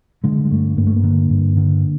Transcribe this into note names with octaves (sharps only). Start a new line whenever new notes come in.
D3 G#3
G#3
G2 A3
G2 A#3
A3
A#3
D3
G2
D3